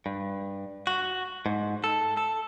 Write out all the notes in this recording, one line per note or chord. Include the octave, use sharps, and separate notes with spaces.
G2
F#4
G#2
A4
A4